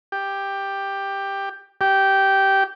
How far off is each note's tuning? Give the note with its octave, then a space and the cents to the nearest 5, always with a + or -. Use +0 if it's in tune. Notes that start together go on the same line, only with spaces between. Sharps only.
G4 +10
G4 -10